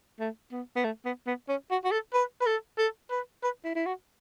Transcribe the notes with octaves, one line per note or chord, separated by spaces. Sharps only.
A3
B3
B3
A3
B3
B3
C#4
F#4
F#4
A4
B4
B4
A4
A4
B4
B4
E4
E4
F#4